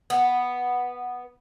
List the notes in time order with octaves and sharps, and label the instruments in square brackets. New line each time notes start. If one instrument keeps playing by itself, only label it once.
[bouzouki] B3